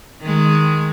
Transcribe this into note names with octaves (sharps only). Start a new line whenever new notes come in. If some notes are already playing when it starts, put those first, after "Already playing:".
D#3 G#3